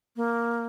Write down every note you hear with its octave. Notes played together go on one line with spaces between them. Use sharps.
A#3